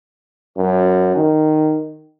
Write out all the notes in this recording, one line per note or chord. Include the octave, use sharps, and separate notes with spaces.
F#2
D#3